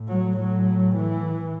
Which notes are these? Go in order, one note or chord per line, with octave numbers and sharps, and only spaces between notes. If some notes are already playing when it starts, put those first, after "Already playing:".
Already playing: A2
F#3
F#3
E3